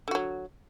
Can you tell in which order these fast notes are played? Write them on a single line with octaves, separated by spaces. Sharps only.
D3 F#4 F#3